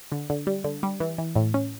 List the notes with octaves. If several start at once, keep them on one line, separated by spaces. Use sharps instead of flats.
D3
D3
G3
D3
G3
E3
E3
A2
C#4